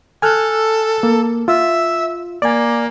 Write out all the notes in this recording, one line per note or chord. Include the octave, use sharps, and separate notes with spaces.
A4 G#5 F6 F#6
A#3
F4 E5
A#3 D5 G#5